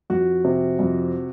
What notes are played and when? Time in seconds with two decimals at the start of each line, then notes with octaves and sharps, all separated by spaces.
0.10 F2 F#4
0.44 C3
0.79 F2